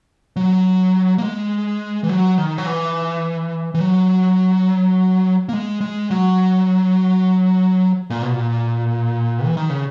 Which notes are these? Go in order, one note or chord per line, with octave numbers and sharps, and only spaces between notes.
F#3
A#3
G#3
E3
F#3
D#3
F#3
E3
E3
F#3
A#3
G#3
G#3
F#3
A#2
B2
A#2
E3
D#3
C#3